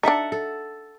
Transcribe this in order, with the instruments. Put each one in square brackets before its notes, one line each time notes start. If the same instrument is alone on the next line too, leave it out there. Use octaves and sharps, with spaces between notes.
[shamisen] D4 D#4 [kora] A4 E5 F#5
[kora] A4